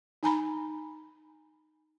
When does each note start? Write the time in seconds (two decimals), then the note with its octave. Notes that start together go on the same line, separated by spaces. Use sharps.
0.23 D#4 G#5 A#5 B5